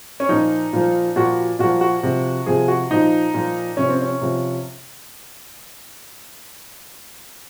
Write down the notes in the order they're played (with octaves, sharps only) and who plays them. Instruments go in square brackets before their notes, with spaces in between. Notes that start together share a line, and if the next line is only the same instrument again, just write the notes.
[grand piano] C#4
A#2 F3 D#4
A#2 F3
A#2 F3 F#4
A#2 F3 F#4
F#4
C3 F3
C3 F3 G#4
F#4
A#2 F3 D#4
A#2 F3
C3 F3 C#4
C4
C#4
C3 F3